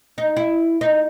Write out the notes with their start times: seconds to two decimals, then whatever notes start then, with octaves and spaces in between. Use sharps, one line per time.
0.18 D#4
0.37 E4
0.81 D#4